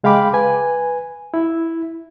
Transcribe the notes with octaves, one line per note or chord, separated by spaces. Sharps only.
C#3 G#3 F5 G5 B5 D6
B4 G#5
E4